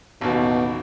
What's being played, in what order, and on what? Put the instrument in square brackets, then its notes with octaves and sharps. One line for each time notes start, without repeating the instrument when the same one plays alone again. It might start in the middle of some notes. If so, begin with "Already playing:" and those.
[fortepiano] A1 D#2 [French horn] B2